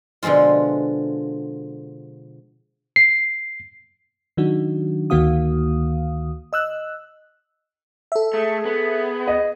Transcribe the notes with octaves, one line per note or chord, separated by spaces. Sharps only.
B2 D3 F3 G#3 F4
C7
D#3 F#3 D4 D#4 F#4
D2 D#3 A#3 F#4 F5 D#6
D#5 E6 F#6
A4 E5
A3 G#4
B3
D#5